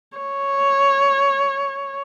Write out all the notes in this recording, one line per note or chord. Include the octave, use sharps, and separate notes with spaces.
C#5